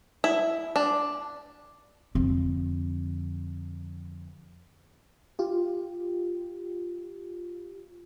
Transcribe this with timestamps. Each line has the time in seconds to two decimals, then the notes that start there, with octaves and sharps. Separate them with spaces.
0.24 E4
0.76 D4
2.15 F2 D3
5.39 F4 G4